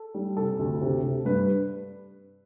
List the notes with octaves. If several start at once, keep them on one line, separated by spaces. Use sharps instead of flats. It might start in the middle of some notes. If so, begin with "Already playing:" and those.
Already playing: A4
G3
C3 A4
D2
C3
C3
G2 B4